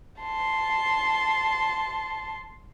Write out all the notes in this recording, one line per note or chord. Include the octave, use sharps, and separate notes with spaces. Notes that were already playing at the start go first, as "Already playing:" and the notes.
A5 C6